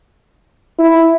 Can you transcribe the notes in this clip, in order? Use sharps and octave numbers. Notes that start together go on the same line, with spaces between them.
E4